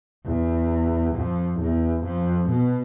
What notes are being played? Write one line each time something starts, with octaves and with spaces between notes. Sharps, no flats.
E2
F2
E2
F2
B2